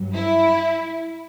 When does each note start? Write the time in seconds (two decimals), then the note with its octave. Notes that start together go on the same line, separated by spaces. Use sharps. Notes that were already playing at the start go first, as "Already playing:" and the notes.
Already playing: G2 F#3
0.12 E4